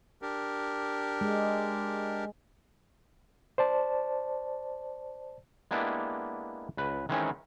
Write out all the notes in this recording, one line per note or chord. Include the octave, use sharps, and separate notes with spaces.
D4 G4 A#4
G#3
C5 D5 A5
G#3 A#3 B3 D4 E4 G4
C#2 B4
D#3 E3 G#3 C4 C#4 D#4